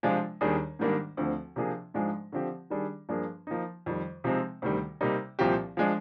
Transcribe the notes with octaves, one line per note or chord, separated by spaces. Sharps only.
C3 F3 G#3 D4 F4
D#2 D#3 G3 D4 G#4
G#2 D#3 G3 A#3 D4
D2 D3 F3 C4
C3 F3 A#3 D4 G#4
G#2 F3 G#3 D4
D3 F3 C4 G4
D#3 G3 D4 G#4
G2 F3 A#3 D4 G#4
F3 A#3 D#4
F2 D#3 G3
C3 F3 G#3 C4 D#4
D2 C3 D#3 G3
C3 G3 A#3 D#4
C2 A#2 F3 C4 G4
F3 G#3 D4